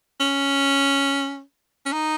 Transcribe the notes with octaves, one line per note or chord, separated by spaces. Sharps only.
C#4
C#4
D#4